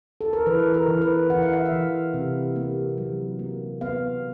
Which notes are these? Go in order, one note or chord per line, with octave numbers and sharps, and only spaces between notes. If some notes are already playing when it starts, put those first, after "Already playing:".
A4
A#4
E3 B4
A#4
E3
B4
E3 F#5
F5
E5
F5
E3
C3
A#3
F#3
A#3
B3 F5